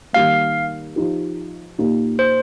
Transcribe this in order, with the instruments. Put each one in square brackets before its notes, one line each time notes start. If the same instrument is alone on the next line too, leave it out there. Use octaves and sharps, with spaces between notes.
[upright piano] D#3 G3 A#3 [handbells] F5
[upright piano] F3 D#4 G4
A#2 A#3 D#4 G4
[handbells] C5